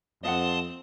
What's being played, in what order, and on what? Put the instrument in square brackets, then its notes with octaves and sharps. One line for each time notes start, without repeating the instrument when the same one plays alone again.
[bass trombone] F2 [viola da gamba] C4 [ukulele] D#5 F5 F#5 [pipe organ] A5 C6 D#6